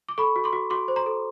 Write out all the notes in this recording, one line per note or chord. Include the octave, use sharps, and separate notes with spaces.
D6
A4 B5 C#6
F#4
C6 D6
F#4
F#4 C6 D6
C5
A#5 C6
A4